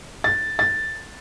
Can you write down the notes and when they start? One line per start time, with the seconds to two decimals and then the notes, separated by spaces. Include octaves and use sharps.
0.24 A6
0.59 A6